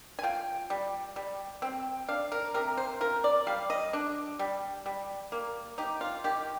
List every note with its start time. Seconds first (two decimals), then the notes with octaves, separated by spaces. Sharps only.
0.19 G#5
0.23 F4 G5
0.70 G3
1.16 G3
1.62 C4
2.09 D4 F5
2.32 A#4
2.54 C3 A#4
2.77 C5
3.01 F4 A#4
3.24 D5
3.47 G3 F5
3.70 D#5
3.93 D4
4.39 G3
4.86 G3
5.32 A#3
5.78 D#4 G4
6.01 F4
6.24 D#3 G4